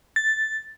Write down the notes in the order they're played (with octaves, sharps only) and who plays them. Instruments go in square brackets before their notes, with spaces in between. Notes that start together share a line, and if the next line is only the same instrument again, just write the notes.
[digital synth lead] A6